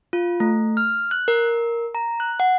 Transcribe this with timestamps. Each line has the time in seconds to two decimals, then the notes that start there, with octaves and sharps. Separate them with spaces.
0.13 F4
0.40 A3
0.77 F6
1.11 F#6
1.28 A#4
1.95 A#5
2.20 F#6
2.40 F#5